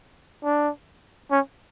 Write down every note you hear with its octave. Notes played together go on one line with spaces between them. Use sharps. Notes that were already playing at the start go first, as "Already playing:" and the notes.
D4
C#4